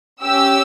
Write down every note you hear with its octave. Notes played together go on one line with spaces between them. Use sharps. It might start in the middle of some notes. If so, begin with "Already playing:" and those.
C#4 G4 E6